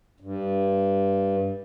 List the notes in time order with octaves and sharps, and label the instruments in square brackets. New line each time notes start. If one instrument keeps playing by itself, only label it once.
[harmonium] G2